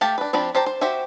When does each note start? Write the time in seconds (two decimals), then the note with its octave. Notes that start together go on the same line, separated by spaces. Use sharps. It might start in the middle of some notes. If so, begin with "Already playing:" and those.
0.01 A3 G4 F5 G5 A5
0.18 D4 B4
0.33 F3 C4 D4 F4 B5
0.55 G4 C5 A5 A#5
0.66 C5
0.81 F#4 G4 C5 E5